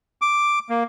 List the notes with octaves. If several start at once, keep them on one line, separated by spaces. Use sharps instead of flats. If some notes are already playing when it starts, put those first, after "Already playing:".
D6
A#3